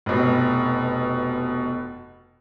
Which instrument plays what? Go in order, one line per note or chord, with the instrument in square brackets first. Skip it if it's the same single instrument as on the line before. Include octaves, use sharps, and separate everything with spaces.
[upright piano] F1 B2